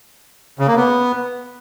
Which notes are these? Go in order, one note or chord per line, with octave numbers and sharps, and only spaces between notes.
C#3
A#3
B3